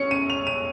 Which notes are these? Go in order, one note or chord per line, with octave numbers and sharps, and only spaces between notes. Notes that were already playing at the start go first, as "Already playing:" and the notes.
Already playing: C#4 C#7
D#7
F7
D#7